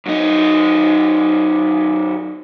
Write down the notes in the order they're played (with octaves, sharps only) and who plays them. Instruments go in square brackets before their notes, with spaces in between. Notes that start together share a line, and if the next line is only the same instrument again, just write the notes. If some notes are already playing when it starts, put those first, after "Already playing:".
[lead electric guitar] F#2 D#4